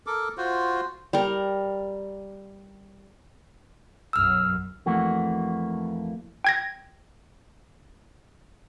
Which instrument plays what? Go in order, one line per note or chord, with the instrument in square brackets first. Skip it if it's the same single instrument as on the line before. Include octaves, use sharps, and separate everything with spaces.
[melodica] A4 A#4 D6
F4 F#4 C5
[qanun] G3 A#4
[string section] B1 F#2 [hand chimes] E6 F6
[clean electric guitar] F2 E3 A3 A#3 F#4
[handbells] G5 G#6 A#6